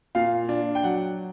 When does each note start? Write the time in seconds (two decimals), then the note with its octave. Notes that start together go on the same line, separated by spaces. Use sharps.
0.15 A#2 F5
0.49 D4
0.75 G5
0.83 F#3 F#5